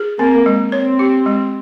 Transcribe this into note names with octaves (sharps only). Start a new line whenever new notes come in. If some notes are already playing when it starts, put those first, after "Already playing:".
Already playing: G#4
A#3 C4
G#3
C4 C#5
G4
G#3